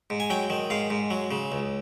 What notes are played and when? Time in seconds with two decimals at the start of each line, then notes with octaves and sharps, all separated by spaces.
0.10 G#2
0.20 G#5
0.30 F#3 G5
0.50 D#3
0.70 G#2 F5
0.90 G#2
1.11 F#3
1.31 C#3
1.52 C#2